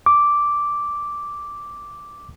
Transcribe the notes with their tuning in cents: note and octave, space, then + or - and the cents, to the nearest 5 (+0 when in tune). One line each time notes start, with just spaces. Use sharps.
D6 -5